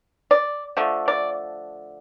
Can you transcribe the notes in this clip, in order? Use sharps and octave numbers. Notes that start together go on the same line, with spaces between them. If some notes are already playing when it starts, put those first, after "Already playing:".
D5
D3 F3 A3
D5